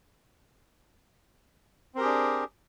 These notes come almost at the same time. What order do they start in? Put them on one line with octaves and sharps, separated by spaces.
C4 A#4 G4 G#4 D4